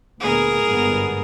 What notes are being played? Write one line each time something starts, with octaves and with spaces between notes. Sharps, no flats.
D2 A#2 B3 G#4 A#4
G1 G#2 B3